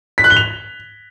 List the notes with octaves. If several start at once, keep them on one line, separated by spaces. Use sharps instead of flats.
B6
F#6
G7
F7